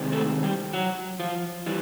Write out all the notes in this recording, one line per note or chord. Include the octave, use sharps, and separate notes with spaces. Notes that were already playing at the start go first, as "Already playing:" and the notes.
Already playing: C3 D#3 G#3 C4
A3 A4
G3 G4
F#3 F#4
F3 F4
E3 G3